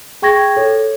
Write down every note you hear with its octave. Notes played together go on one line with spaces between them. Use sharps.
G#4 G5 C#6 G#6 A#6
A4 C#5